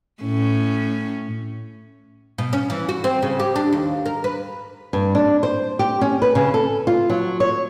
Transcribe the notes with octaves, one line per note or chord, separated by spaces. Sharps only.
A2 C#4
B2
C#4
E3
F#4
C4
C#3
G4
D4
D#2
A#4
B4
G2
D4
C5
G4
C#4
B4
C#3
A4
F4
F#3
C#5